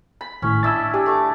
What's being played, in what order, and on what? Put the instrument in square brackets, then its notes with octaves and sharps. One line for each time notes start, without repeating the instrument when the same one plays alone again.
[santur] B5
[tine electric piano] G#1 A2 [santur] C#4
[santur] D4 E4 D#5 [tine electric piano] E6 A6
[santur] D4 [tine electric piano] G4 G#5
[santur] A3 D4 D6